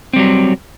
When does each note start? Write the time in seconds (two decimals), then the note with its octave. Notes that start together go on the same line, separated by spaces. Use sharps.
0.13 C4
0.16 G3
0.19 F#3